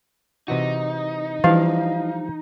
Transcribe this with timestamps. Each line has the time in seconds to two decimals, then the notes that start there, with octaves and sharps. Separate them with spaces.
0.48 C3 E3 D#4 F#4
1.44 E3 F3 G3 D4 E4 F5